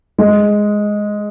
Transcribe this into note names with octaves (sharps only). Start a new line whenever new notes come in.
G#3